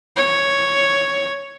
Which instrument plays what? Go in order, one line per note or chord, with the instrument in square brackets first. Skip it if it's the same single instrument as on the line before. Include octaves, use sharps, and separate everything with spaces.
[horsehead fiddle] C#5